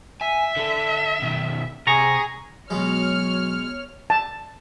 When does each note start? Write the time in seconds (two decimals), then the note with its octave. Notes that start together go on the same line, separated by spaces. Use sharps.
0.21 E5 G#5
0.56 D3 A4
1.22 B2 D#3
1.87 C3 G#4 A#5 C#6 A#6
2.70 B2 F#3 G#3 C#5 F6
4.10 A5